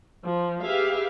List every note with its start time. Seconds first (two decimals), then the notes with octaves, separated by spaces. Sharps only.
0.25 F3
0.62 G4 G#4 B4 E5 F5